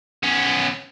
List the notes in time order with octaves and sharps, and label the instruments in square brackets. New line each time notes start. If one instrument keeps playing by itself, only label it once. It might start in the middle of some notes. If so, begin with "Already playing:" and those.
[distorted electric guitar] B3 C#4